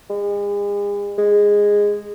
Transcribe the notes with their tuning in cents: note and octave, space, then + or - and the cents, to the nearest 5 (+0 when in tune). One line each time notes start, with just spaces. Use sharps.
G#3 -40
G#3 -10